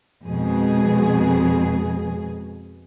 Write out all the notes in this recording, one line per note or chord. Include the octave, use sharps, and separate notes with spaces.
F2 B2 G#3 G#4